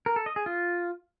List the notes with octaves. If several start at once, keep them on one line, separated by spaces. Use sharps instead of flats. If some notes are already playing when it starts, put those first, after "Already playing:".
A#4
A4
D#5
G#4
F4